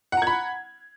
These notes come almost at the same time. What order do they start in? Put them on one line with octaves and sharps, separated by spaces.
F#5 A#5 G#6 B5